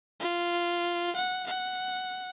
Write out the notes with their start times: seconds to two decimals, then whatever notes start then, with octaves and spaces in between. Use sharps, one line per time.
0.20 F4
1.16 F#5
1.46 F#5